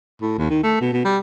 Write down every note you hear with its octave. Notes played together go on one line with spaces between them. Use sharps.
A2
D#2
D#3
A3
B2
B2
G3